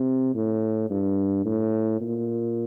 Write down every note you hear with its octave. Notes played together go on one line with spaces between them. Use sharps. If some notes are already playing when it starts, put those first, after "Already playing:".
Already playing: C3
A2
G2
A2
A#2